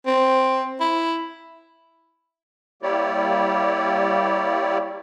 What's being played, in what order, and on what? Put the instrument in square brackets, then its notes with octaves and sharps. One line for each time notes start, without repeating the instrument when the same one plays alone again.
[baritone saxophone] C4
E4
[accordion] G3 A#3 E4 G4 C#5 D5